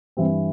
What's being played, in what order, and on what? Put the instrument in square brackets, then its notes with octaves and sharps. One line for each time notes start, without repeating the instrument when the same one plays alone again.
[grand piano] G2 E3 G3 C4